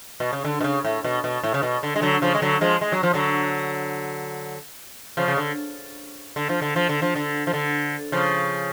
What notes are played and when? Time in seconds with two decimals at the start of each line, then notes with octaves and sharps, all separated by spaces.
0.20 B2
0.33 C#3
0.45 D3
0.61 B2
0.64 C#3
0.85 A2
1.04 B2
1.24 B2
1.43 A2
1.54 C#3
1.63 B2
1.83 D3
1.96 G#3
2.02 D3 F#3
2.22 C#3 F3
2.34 G#3
2.42 D3 F#3
2.61 F3 G#3
2.81 G#3
2.92 F#3
3.03 F3
3.14 D3 F#3
5.17 C#3 F3
5.28 C#3
5.37 D3
6.36 D3
6.49 F3
6.62 D3
6.76 F3
6.89 D3
7.02 F3
7.16 D3
7.47 F3
7.53 D3
8.12 C#3 F3